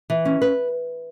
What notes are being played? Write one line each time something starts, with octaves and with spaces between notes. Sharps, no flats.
E3
C#4
B4